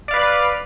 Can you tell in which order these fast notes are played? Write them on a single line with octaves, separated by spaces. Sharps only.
D5 F5 B4